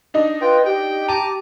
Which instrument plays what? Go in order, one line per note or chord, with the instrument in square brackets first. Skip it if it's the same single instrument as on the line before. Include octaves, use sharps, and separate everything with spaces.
[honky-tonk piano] D4 D#4 D#5
[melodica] F4 G5 [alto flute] B4
[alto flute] G4 [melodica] G5
[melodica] A5 A#5 D6 [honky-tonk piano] D#7